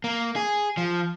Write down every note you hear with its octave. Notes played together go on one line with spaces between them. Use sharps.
A#3
G#4
F3